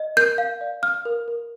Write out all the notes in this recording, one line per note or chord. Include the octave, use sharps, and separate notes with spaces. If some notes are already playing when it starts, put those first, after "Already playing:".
Already playing: D#5
A#4 G6
F5
D5
F5 F6
A#4
A#4